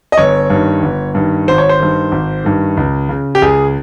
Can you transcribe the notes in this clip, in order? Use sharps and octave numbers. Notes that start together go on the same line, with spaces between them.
D#5
G1 C#5
G2 D#3
G1
G2 D#3
G#1 C5
C#5
C5
G2 D#3
G#1
G2 D#3
C#2
C#3
G4
C#2 G#4